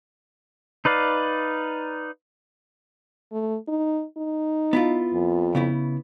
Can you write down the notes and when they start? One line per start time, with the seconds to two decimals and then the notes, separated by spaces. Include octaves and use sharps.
0.85 D#4 B4 D5 F5
3.32 A3
3.68 D#4
4.17 D#4
4.73 B3 E4 F4
5.13 F2
5.55 C#3 B3 E4